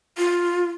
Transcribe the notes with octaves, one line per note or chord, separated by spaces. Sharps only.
F4